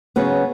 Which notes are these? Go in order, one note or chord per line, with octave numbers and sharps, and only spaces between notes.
C#3 F#3 B3 G#4 C#5